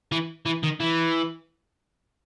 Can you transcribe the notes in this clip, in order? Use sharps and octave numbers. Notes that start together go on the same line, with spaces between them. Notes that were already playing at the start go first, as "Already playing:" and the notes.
E3
E3
D#3
E3